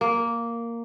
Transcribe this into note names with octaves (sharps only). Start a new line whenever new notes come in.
A#3